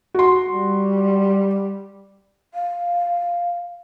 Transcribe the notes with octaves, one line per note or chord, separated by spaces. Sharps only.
F#4 C6
G3
F5